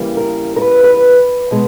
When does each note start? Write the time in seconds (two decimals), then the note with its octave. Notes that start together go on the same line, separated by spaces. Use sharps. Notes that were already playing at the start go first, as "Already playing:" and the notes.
Already playing: E2 C#3 E3 G3 A#3
0.17 A#4
0.56 A#4
0.62 B4
0.84 B4
1.51 B2 G#3 B3